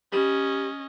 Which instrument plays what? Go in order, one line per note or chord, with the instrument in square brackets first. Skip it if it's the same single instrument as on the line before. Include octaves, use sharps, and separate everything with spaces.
[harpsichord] G3 [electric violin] C#4 D#5